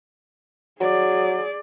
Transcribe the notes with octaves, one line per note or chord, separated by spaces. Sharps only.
F#3 G#4 D5